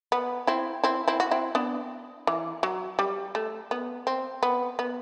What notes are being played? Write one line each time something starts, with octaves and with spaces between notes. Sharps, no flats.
B3
C4 E4
C4 E4
C4 E4
F#4
C4 E4
B3 D4
E3
F#3
G3
A3
B3
C4
B3
B3